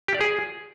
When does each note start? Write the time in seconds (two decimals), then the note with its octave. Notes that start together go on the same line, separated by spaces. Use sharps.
0.08 G4
0.14 D5
0.21 G#4